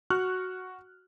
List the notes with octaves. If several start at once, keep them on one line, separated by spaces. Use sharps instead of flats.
F#4 C#6 F6 F#6